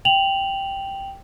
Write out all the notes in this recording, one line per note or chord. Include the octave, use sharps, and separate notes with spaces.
G5 F7 F#7